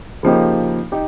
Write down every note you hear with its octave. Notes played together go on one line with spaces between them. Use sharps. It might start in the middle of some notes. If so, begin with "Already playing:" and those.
C#3 F3 A#3 D#4 G4
D#4 G4